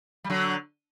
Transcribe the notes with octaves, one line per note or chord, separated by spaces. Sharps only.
G3
D3 F#3